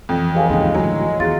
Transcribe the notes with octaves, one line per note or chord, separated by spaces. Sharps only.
F2 E3 F3
C#2 G4 F5 G#5
D#2 G#2 C#3 G#3
D2 A2 F#3
E2 D#3 F4 G#4 A6